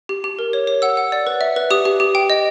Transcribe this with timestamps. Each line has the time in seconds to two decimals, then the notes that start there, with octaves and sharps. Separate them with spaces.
0.09 G4
0.24 G4
0.39 A#4
0.53 C#5
0.67 C#5
0.82 F#5 E6
0.97 F#5
1.12 D5
1.27 B4
1.41 E5
1.56 B4
1.71 G4 D#6
1.85 G4
2.00 G4
2.15 G5
2.30 D#5